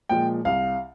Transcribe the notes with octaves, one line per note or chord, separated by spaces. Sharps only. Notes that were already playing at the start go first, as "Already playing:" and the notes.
A#2 F3 G#3 G5
C2 F5